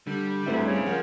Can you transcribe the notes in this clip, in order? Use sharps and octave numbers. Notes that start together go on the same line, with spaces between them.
D3 G3
D2 G2 A3 C4 D4 E4 C5
C#3
F3 A#4 F#5